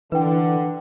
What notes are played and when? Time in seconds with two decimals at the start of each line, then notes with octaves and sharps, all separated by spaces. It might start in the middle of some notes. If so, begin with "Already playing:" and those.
0.12 D3 E3 B4 G5